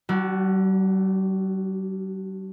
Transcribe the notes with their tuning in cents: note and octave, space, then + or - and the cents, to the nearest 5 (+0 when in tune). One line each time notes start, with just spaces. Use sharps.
G3 -45 D4 +0 F#4 +0